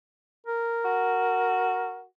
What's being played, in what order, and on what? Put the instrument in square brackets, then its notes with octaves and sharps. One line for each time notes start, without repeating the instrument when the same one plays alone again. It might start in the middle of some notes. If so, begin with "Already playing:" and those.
[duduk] A#4
[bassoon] F#4